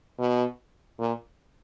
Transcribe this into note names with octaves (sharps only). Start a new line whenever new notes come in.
B2
A#2